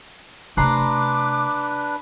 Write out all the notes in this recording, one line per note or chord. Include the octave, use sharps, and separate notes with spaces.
C3 A3 D4 B4 A#5 C6 D6 F#6